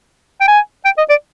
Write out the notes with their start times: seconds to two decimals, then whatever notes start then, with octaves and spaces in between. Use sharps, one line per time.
0.41 G5
0.48 G#5
0.85 G5
0.98 D#5
1.10 D5